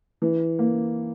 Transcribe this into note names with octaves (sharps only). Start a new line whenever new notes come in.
E3
A#3